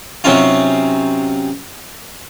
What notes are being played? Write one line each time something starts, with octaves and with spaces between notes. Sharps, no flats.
C3 F#3 C4 C#4 D#4 F4